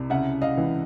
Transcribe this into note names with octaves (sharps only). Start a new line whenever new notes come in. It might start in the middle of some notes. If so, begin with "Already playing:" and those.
Already playing: C2 C3
C#3 E5 F#5
D#5 F5
E3